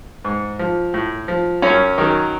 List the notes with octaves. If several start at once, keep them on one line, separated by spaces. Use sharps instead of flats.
G#2
F3
A2
F3
F#2 C#4 C#5
D#3 F#3